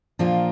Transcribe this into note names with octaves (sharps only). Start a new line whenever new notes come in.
A#2 F3 A#3 D4 F4